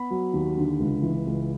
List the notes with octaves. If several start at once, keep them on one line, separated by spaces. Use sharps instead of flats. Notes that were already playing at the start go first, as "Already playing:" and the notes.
Already playing: B3 B5
F#3
D#2
D3
C#2
E3
C#2